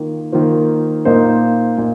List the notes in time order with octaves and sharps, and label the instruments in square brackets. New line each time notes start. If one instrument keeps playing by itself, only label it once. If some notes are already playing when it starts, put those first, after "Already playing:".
Already playing: [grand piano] D#3 A#3 F4
D#3 A#3 F4 C5
A#2 A#3 D#4 C5
A#2